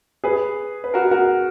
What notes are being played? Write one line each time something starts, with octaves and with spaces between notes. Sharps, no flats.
G#4 B4
B4
F#4 A#4
F#4 A#4